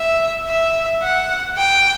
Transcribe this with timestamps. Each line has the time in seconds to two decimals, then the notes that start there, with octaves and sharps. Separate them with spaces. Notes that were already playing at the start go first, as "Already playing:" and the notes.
Already playing: E5
0.47 E5
1.02 F#5
1.57 G5